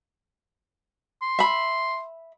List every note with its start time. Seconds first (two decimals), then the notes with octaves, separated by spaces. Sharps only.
1.22 C6
1.39 E5 B5